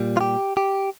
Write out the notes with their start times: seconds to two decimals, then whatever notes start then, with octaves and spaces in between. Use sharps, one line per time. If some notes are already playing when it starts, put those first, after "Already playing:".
Already playing: A#2 G3
0.17 F4
0.21 G4
0.57 G4